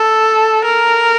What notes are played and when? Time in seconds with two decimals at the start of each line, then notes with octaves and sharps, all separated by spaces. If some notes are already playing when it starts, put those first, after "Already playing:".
Already playing: A4
0.65 A#4